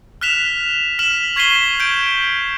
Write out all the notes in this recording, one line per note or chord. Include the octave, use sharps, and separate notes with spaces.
F6 F#6 B6 E7 F7
F6 B6 E7 F#7
C#6 G#6 B6 C7 D#7 G7
G6 D7